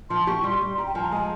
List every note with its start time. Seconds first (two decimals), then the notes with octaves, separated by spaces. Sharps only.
0.10 F3 C6
0.27 G4 C#6
0.44 G3 C6
0.61 G3
0.78 G4 A#5
0.86 G5
0.95 F3 G#5
1.03 A#5
1.12 G#3 G#5